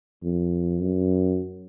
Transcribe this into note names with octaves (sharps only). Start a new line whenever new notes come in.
F2
F#2